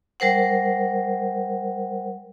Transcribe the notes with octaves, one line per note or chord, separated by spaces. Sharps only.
G3 A#4 C5 F#5